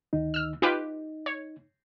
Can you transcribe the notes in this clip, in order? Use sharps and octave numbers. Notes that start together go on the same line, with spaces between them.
D2 D#3 D#4
E6 F6
D#4 F4 G4 B4
C#5